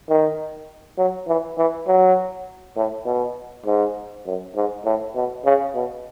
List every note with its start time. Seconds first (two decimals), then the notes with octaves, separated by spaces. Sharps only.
0.09 D#3
0.98 F#3
1.28 E3
1.58 E3
1.87 F#3
2.76 A2
3.06 B2
3.66 G#2
4.26 F#2
4.55 G#2
4.85 A2
5.15 B2
5.45 C#3
5.75 B2